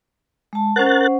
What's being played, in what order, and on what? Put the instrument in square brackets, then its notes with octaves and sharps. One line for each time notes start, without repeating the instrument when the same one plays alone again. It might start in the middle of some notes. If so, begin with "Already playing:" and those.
[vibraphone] G#3 A5
[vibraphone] C#4 C5 F#5 [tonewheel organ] A#4 F#6 A6